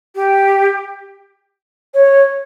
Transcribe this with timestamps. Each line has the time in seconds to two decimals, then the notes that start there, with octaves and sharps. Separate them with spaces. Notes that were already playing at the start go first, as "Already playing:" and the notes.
0.15 G4
1.94 C#5